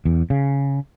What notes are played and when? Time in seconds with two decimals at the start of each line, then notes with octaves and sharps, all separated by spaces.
0.05 E2
0.30 C#3